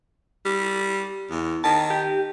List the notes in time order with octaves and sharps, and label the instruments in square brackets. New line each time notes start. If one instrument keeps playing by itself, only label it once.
[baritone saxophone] G3
E2
[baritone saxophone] D#3 [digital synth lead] A5
[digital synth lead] G4